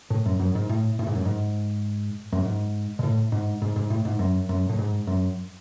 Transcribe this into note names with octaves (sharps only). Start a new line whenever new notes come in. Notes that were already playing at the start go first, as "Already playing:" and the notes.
A2
F#2
F#2
G#2
A2
A2
G#2
F#2
G#2
F#2
G#2
B2
A2
G#2
G#2
G#2
A2
G#2
F#2
F#2
A2
G#2
F#2